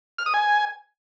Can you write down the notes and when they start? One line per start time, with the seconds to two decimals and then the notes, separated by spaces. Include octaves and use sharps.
0.18 F6
0.26 D#6
0.34 G#5